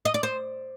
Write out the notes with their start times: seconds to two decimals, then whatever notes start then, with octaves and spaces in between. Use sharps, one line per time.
0.05 D#5
0.14 D5
0.23 C5